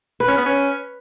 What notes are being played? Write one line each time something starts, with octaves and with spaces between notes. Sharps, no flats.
B4
C#4
B3
C#4